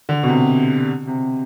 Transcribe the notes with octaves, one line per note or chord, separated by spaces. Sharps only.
D3
B2
C3
C3